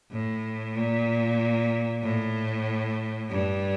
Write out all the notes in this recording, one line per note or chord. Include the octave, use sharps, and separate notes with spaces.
A2
A#2
A2
G2